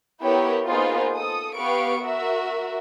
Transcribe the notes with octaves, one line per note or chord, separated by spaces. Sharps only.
B3 E4 G4 A#4 C#5 G5
A#3 B3 D#4 F4 G#4 C5
A4 D#6
B3 G4 B4 F5 C#6 D7
F#4 A#4 E5